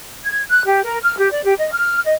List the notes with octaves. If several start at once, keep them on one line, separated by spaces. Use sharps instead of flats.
G#6
F#6
G4
A#4
F6
G4
D5
G4
D#5
F6
D#5